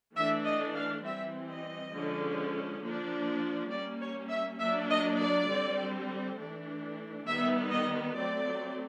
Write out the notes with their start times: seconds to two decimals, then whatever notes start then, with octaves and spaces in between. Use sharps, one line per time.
0.15 E3 A3 D4 E5
0.45 D#5
0.74 F5
1.04 E3 G3 C4 E5
1.49 D#5
1.93 D3 F3 G#3 C#4
2.82 F3 A#3 D4
3.71 G3 A#3 C#4 D5
4.01 C#5
4.30 E5
4.60 F#3 A#3 D4 E5
4.89 D#5
5.19 D5
5.49 D3 G3 C4
6.38 E3 A3 D4
7.27 D#3 G3 B3 E5
7.71 D#5
8.16 F#3 A3 C4 D5